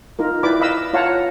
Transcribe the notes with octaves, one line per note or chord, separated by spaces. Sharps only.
D#4 F4 A#4
E4 B4 D5 G5 B5 D6
D#5 F5 B5 E6
F4 C#5 F5 F#5 A5 A#5